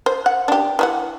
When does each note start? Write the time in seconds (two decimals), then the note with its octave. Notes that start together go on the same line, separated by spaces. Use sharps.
0.06 C5
0.26 F#5
0.48 D4 G4
0.79 E3 D#4 F#5